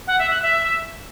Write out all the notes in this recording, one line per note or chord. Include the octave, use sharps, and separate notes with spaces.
F#5
E5
F#6
E5